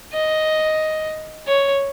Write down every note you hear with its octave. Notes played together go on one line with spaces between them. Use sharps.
D#5
C#5